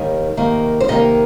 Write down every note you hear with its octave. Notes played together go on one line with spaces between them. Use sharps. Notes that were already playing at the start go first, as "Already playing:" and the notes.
Already playing: D#2 D#3 G3
C3 D#3 A#3
C5
C3 D#3 A#3 D#5